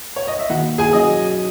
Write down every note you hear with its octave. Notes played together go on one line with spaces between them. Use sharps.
C#5
D#5
E5
D#3 A#3 E4 F#4 F#5
G#4 G#5
F#3 C#4 F#4 D#5 D#6